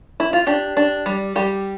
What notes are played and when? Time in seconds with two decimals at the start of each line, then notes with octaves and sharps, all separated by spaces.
0.20 E4
0.33 F4
0.47 D4 G4
0.77 D4
1.06 G3
1.36 G3 G4